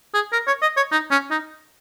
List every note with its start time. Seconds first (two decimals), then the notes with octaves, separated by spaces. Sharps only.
0.14 G#4
0.32 A#4
0.47 C#5
0.62 D#5
0.77 C#5
0.91 D#4
1.11 C#4
1.31 D#4